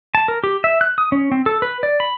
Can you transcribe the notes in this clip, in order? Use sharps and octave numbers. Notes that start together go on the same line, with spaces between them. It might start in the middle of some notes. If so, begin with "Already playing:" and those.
A5
A#4
G4
E5
F#6
D#6
C#4
C4
A4
B4
D5
B5